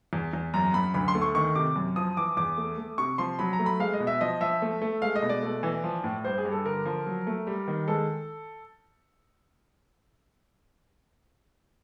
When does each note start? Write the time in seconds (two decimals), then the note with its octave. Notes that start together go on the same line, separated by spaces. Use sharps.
0.13 E2
0.33 E2
0.54 F#2 A#5
0.74 F#2 B5
0.94 D2 B5
1.08 C6
1.15 A3
1.22 C#6
1.35 D#3 C#6
1.55 C3 D6
1.76 F#2
1.96 F3 D#6
2.17 E3 D6
2.37 E2 D6
2.58 A3
2.78 A3
2.98 C3 C#6
3.18 F3 C6
3.39 F#3 B5
3.53 A#5
3.59 A3
3.66 B5
3.80 G#3 F5
3.94 D#5
4.00 B2
4.07 E5
4.21 F3 D#5
4.41 F3 E5
4.62 A3
4.82 A3
5.02 G#3 F5
5.16 D#5
5.23 B2
5.29 D5
5.43 A3
5.63 E3
5.84 F3
6.04 A2
6.24 G2 C5
6.38 G#4
6.45 G2
6.52 A4
6.65 D3 A#4
6.85 F3
7.06 F#3
7.27 A3
7.47 G3
7.68 D#3
7.88 G#3 A4